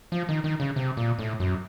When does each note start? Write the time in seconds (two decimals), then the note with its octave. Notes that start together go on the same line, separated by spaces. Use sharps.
0.12 F3
0.29 D#3
0.44 D#3
0.60 C#3
0.76 C3
0.97 A#2
1.19 A2
1.40 F#2